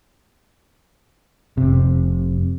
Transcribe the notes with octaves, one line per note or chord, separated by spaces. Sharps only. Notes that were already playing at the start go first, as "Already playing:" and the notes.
F1 C3